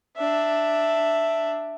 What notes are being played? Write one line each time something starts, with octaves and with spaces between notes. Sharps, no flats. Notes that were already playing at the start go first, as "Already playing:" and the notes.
D4 E5